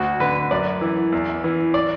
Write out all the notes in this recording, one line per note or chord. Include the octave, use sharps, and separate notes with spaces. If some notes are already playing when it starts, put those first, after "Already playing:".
Already playing: D2 F#4
D3 B4
F#2 D5
E3
E2
E3
D5